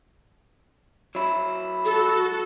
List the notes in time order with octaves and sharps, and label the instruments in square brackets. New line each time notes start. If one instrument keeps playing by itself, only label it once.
[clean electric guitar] F#3 E4
[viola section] F#4 A4